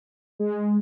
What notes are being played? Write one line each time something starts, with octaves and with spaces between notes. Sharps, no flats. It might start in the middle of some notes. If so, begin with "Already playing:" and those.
G#3